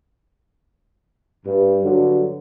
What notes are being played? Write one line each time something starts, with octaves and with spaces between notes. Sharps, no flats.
G2
G2 D3 F#3